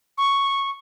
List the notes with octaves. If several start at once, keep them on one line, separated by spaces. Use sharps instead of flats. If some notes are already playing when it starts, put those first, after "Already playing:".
C#6